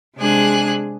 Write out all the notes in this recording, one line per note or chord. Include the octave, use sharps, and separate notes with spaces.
C3 G#3 D4 G#4 G#5 F#6